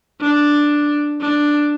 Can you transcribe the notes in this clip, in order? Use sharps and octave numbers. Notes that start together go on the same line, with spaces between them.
D4
D4